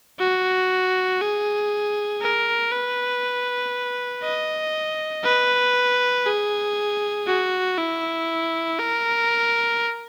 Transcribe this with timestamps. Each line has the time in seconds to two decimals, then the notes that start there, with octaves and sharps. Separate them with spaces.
0.19 F#4
1.21 G#4
2.22 A#4
2.72 B4
4.23 D#5
5.24 B4
6.26 G#4
7.27 F#4
7.77 E4
8.79 A#4